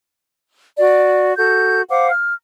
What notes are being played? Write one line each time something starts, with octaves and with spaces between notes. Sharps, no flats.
F#4 D5
F#4 A4 G6
C5 F5 F#5 D6
F6